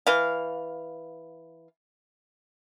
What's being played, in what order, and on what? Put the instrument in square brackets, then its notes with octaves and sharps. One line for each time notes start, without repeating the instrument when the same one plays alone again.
[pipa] E3 F5